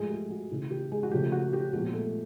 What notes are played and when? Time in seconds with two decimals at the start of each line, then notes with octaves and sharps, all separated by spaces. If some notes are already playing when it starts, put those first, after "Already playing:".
Already playing: G#2 F3 G#3 A3 G#4
0.10 G4
0.30 F#4
0.51 C#3 E3 A3
0.71 G4
0.92 G#3 G#4
1.03 F#4
1.11 C#3 F3 A3 G4
1.32 F#4
1.53 G4
1.73 A#2 F3 G#3 B3 G4
1.94 A3 A4